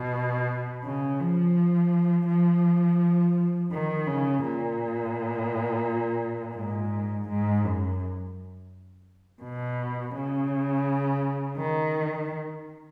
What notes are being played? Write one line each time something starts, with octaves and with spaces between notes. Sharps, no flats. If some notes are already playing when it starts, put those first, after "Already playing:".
Already playing: B2
C#3
F3
F3
D#3
C#3
A#2
G#2
G#2
F#2
B2
C#3
D#3